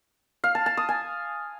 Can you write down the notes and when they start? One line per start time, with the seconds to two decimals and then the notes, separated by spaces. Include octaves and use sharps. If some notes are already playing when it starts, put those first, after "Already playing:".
0.44 F5
0.55 A5
0.66 A5
0.77 D#6
0.89 G#5